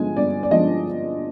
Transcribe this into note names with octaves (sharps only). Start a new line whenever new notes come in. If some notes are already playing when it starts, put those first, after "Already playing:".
Already playing: G2 D3 F3 G#3 G#5
G2 D5
D5
D3 F3 G#3 D#5